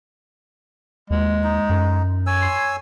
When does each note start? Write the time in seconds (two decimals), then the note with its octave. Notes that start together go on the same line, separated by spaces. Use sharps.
1.10 D#2 G#3
1.44 D#4
1.69 F#2
2.27 C#5 G#5 E6
2.42 C6